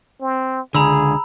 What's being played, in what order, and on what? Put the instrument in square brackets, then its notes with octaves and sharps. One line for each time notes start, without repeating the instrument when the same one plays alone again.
[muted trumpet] C4
[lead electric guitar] C#2 D3 [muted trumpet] G#4 [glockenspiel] A#5 B5 E6